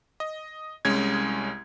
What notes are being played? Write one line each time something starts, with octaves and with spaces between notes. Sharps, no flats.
D#5
C2 G#3 C#4 G#6